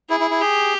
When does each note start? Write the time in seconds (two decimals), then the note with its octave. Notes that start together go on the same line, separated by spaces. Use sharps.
0.10 E4 G#4
0.20 E4
0.31 E4
0.41 G4 G#4